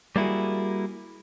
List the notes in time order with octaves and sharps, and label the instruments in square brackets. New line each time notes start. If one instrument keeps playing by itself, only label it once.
[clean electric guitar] G3 A#3 E4 F#4 G#4